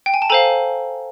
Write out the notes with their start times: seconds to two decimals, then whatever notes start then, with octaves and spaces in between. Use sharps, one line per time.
0.06 G5
0.14 G#5
0.22 A5
0.30 A4 C5 F5 G#5 A#5